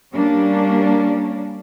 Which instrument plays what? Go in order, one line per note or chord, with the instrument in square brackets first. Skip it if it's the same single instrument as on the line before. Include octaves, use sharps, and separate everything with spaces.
[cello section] G3 A#3 C#4 D4